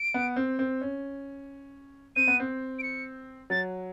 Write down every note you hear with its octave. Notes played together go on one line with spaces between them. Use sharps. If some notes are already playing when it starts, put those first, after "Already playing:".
Already playing: D7
B3
C4
C4
C#4
C4 D#7
B3
C4
D7
C#7
F#3 A6